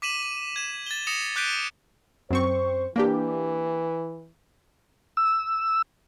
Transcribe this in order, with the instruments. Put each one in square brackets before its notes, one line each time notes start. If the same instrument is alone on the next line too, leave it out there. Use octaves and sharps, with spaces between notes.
[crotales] D6 B6 D#7 E7 F#7
D#7
G#6 E7
A6 G7
D#6 A#6 C#7 E7 F7
D6 F#6 G6 B6 D7 D#7
[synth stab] F#2 C4 C#6 [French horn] C5
[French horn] E3 [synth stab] A#3 D4 G4
[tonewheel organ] E6